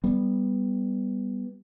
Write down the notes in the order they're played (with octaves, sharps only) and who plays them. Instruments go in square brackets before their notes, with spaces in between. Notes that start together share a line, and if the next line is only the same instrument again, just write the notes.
[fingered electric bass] G3 B3